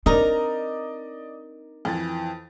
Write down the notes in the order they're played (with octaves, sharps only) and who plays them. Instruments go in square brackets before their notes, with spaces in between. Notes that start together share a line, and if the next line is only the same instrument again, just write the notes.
[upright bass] C4 D4 [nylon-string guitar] D#4 A#4 [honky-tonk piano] D5 D#5
[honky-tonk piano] F2 E3 A6